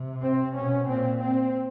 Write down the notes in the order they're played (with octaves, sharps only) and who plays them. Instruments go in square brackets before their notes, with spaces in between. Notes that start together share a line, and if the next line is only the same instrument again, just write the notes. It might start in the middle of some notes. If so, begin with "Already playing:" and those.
Already playing: [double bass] C3
[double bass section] C4
[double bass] B2 [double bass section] C#4
[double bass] A#2 [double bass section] C4
[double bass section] C4